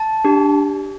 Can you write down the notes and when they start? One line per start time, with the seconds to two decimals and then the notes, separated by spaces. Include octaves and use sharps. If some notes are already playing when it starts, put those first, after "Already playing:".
Already playing: A5
0.25 D4 G4